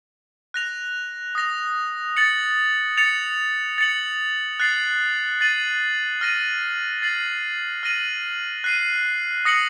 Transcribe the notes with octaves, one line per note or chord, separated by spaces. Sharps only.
F#6 A#6 F7
D#6 A#6 F7
A6 C#7 F#7
A6 C#7 F7
A6 C#7 F#7
F#6 A6 C7 F#7
A6 C7 D#7 F#7
F6 A#6 D#7 F#7
A6 C7 F#7
F6 A#6 D#7 F#7
F#6 C7 D#7
D#6 A#6 C#7 F#7